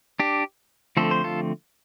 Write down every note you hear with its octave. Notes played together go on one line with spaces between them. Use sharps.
D4 G4
D3 F3 A3 C4 A4
C5
F4 A4